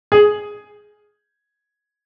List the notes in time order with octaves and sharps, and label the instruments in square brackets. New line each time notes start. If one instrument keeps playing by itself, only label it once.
[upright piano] G#4